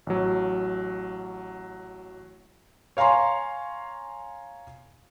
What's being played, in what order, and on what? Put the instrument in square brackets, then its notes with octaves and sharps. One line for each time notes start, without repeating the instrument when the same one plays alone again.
[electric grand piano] A1 F#3
[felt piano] C#5 F5 G#5 A#5 C6